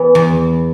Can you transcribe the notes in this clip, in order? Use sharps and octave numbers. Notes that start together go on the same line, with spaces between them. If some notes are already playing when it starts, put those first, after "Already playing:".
Already playing: E3 B3
E2